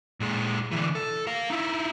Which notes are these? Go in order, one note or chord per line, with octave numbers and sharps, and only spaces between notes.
A#2 G#3
D3 E3
A4
A#4 F5
D#4 E4